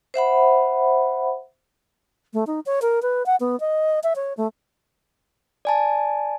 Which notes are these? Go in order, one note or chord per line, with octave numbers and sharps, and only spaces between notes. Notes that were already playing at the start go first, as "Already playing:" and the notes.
C5 E5 F#5 B5
A3
D#4
C#5
A#4
B4
F#5
B3
D#5
E5
C#5
A3
D5 G#5 A5